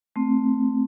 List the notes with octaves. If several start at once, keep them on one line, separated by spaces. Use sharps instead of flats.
A3 C4